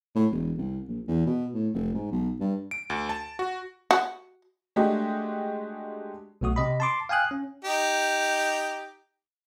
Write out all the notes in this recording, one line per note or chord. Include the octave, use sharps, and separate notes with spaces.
A2
E1
C2
A#1
E2
B2
A2
F1
G#2
B1
G2
D7
D2
A5
F#4
F#4
G#3 A3 D4 F#4 G4 D#5
B1 B2 A3 F#4 D#6
C3 D#5 B5
A5 C6 D6
F5 G5 G#5 D#6 F#6
C#4
D#4 G4